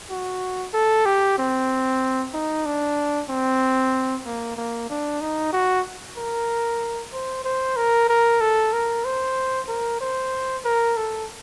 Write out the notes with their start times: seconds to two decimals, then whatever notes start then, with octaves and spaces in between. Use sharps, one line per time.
0.10 F#4
0.74 A4
1.06 G4
1.38 C4
2.34 D#4
2.66 D4
3.29 C4
4.26 A#3
4.57 A#3
4.89 D4
5.21 D#4
5.53 F#4
6.17 A#4
7.13 C5
7.45 C5
7.77 A#4
8.09 A#4
8.41 A4
8.73 A#4
9.05 C5
9.68 A#4
10.01 C5
10.65 A#4
10.97 A4